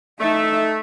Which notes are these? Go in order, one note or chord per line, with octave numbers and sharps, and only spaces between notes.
A3 D#4 E5